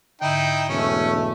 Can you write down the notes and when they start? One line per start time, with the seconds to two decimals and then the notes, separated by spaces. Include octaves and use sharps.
0.21 G#2 D3 D#4 E4 G5
0.68 E1 A3 C#4